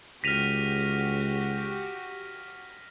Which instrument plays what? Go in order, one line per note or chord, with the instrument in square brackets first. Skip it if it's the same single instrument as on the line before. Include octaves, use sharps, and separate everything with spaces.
[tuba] C#2 [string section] F#4 G4 [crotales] F6 A#6 [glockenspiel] B6 D#7 F7